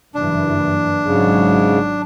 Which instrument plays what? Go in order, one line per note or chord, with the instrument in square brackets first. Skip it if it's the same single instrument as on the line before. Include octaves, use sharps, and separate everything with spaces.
[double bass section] F#1 G2 E3 [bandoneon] D4
[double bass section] G#1 F#3 [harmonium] G#2 C#3